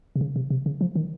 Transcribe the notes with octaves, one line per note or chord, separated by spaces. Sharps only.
C3
C#3
C3
C3
C#3
F3
D#3